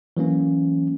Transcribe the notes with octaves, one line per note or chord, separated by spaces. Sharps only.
E3 F#3 A#3 C#4